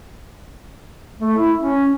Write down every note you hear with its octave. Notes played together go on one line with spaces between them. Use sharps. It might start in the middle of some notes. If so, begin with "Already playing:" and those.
A3
E4
C#4